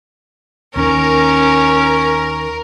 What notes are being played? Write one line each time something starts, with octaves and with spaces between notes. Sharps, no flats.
D#2 D#3 C#4 A#4